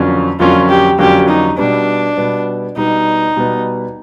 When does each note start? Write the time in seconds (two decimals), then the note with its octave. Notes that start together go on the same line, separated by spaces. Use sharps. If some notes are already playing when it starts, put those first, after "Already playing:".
Already playing: F2 D3 F#3 A#3 C#4
0.39 F2 D3 F#3 A#3 C#4 F4
0.69 G4
0.99 F2 D3 F#3 A#3 C#4 G4
1.28 D#4
1.57 B2 G3 B3 D4
2.17 B2 G3 B3
2.76 B2 G3 B3 D#4
3.36 B2 G3 B3